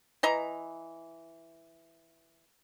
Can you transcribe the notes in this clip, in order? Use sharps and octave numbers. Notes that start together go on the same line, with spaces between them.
E3 D#5 A#5